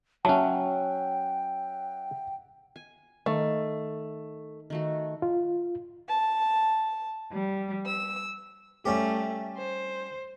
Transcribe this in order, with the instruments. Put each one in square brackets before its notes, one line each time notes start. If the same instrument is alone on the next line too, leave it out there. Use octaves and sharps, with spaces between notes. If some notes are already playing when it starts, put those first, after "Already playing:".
[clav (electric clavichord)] F#3 C#4 [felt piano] E5 F#5 [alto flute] G5 [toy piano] A5
[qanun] G#5
[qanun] D#3 F5 [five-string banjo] A3
[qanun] D#3 A3 F#4
[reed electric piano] F4
[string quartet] A5
G3
E6
[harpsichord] G3 C#4 G4 [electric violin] A3
[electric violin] C5